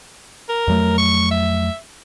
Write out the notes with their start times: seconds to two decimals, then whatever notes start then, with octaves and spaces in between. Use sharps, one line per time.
0.49 A#4
0.68 F2 F#3 A3
0.98 C#6
1.31 E5